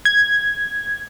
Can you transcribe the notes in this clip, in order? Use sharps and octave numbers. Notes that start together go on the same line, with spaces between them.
G#6